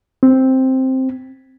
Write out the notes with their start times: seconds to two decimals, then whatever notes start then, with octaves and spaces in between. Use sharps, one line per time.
0.23 C4